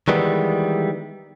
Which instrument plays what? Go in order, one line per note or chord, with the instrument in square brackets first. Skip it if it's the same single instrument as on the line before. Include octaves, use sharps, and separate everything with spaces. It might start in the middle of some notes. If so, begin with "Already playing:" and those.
[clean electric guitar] D#3 E3 G3 G#3 B3